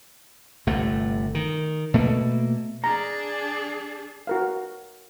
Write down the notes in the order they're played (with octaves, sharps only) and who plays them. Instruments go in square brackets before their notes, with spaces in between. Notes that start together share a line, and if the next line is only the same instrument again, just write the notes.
[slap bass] G1 C3 A3
D#3
B2 A3 A#3
[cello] D4 G#4 [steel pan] A#5
[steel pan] F#4 A#4 F5